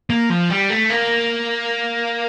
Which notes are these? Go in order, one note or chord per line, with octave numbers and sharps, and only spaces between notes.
A#3
F3
G3
A3
A#3